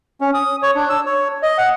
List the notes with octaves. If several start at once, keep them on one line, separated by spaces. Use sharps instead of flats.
C#4
D#6
C#5
D4
E6
C#5
D#5
F#5